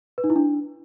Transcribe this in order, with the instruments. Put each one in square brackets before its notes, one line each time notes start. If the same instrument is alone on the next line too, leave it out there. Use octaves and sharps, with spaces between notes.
[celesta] B4
D#4
E4
D4